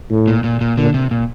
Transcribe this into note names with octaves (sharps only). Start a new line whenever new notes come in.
A2
A#2
A#2
A#2
A#2 D3
C3
A#2